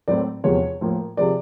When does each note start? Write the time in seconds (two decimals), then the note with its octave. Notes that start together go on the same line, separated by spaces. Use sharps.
0.08 A2 F#3 A3 C4 D5
0.44 E2 C3 F3 G#3 C#5
0.81 A2 F3 A#3
1.17 C3 F3 G#3 D5